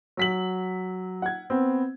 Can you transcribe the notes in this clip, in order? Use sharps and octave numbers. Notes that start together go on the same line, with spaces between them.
F#3 B6 F#7
F#5 G#6
B3 C4